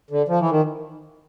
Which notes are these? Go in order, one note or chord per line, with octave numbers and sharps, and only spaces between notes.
D3
F3
E3
D#3